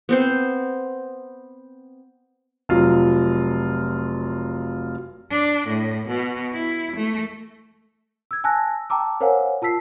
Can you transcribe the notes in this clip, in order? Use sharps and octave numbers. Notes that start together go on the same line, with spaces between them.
B3 C4 C5
F1 F#3 F4
D4
A2
B2
E4
A3
E6 G#6
G#5 A5 E6 F#6 A#6
G5 A5 A#5 D6 E6
A#4 C5 C#5 F5 F#5 G#5
F4 A5 E6 B6 C7